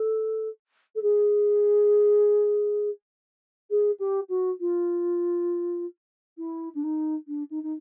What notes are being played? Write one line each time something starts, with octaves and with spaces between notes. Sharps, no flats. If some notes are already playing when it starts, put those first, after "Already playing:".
Already playing: A4
A4
G#4
G#4
G4
F#4
F4
E4
D4
D#4
D4
D#4
D#4